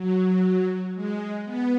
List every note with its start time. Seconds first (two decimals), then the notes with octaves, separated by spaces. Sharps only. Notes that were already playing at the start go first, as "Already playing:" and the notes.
Already playing: F#3
0.94 G#3
1.45 B3